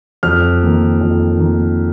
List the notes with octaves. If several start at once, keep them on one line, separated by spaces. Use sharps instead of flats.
F2 F6
D#3 A#3
F2
D#3 A#3